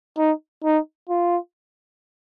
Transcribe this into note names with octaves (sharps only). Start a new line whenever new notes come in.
D#4
D#4
F4